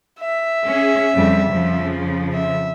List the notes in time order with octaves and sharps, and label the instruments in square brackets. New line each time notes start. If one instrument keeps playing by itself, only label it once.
[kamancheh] E5
[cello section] C#4 G#4
F2 C#3 G3
F2 C#3 F3
[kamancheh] E5